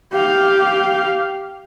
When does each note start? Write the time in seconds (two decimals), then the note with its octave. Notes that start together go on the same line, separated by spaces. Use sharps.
0.13 G4 F5